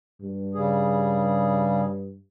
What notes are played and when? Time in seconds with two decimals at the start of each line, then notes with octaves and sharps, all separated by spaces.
0.22 G2
0.55 C#3 G3 G#4